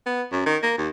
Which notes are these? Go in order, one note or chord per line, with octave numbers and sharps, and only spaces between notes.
B3
F#2
D#3
A#3
D#2